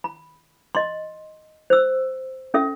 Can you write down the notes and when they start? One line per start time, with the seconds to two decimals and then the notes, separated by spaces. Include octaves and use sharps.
0.04 B5
0.75 D#5 C6
1.70 C5 E6
2.54 C#4 A4 E5